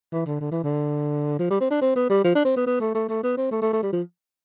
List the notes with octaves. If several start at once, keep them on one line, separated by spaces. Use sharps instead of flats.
E3
D3
D3
E3
D3
F3
G3
C4
D4
C4
B3
G3
F3
D4
C4
B3
B3
A3
A3
A3
B3
C4
A3
A3
A3
G3
F3